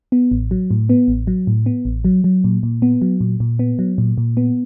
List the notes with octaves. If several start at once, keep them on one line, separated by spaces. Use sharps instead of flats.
B3
A1
F#3
A2
B3
A1
F#3
A2
B3
A1
F#3
F#3
A#2
A#2
B3
F#3
A#2
A#2
B3
F#3
A#2
A#2
B3